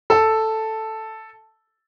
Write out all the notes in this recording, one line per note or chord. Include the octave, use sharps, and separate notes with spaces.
A4